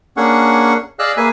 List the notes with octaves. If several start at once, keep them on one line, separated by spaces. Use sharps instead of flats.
A#3 C#4 D4 G#4 F#5 C#6
G#4 D5 D#5 F5 E6 F#6
A#3 G#4 B4 E5 G#5